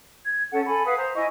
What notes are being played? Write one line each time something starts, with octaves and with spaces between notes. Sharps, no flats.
G#6
C#4 A4 F#5
A4 G#5 B5
B4 F5 F#5 D#6
C5 A#5
E4 D#5 G#5 C#6